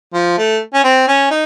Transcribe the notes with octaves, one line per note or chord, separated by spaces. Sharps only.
F3
A3
C#4
C4
C#4
D#4